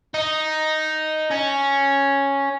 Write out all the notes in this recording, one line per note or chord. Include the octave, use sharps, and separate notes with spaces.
D#4
C#4